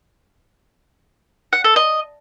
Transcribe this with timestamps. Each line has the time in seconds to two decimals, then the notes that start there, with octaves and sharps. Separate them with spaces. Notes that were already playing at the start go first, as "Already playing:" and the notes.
1.53 F#5
1.64 A4
1.76 D#5